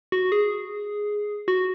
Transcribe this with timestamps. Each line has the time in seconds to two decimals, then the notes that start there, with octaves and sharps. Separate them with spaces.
0.12 F#4
0.32 G#4
1.48 F#4